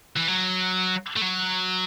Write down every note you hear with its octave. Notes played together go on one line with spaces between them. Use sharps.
E3
F#3
A3
F#3